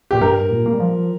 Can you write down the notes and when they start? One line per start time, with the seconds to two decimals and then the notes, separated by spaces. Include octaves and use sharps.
0.11 A#2 G4
0.21 G2 A#4
0.50 A#2
0.66 A#3
0.73 G3
0.80 F3